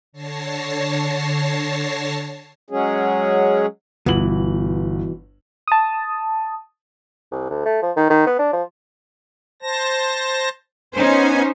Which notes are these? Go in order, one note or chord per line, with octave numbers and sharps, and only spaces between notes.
D3 C#5 A5 A#6 C7
F#3 G#3 C#4 G#4
G1 B2 E3 F#7
A5 D#6
C2
D2
A3
F3
D#3
D#3
B3
D4
F3
C5 A5 A#6
B3 C#4 D#4 C5 G#5